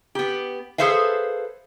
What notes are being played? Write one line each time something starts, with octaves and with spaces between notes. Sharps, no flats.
B3 G4
G#4 A4 B4 C5 E5 F5